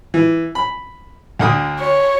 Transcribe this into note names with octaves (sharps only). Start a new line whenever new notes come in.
E3
B5
D2 D3 D#6
C#5